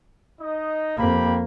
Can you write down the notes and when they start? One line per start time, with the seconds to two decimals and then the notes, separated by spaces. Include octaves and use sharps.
0.40 D#4 D#5
0.97 F2 A#3 G4 B5